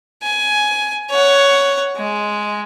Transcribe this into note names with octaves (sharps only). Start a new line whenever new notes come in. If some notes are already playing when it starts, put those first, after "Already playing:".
G#5
C#5 F#5
G#3